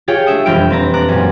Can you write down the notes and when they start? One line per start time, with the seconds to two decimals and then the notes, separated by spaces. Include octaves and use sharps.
0.08 F4 G4 G#4 C#5 D5 G5
0.26 A3 D4 E5 D#6
0.46 E1 F2 G3 G5 F6 D7
0.70 C4 B4 A#5
0.94 A5 A#5 D6 F#6
1.08 F#2 A#2